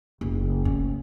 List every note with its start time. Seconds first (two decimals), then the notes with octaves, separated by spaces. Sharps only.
0.21 F#1
0.65 C#4